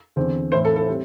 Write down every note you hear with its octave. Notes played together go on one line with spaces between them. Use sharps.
E2 D3 C4
A2 E3 C4 C5
A4
A4
G3 C4